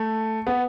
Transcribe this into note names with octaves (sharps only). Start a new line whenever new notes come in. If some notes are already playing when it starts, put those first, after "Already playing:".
Already playing: A3
B3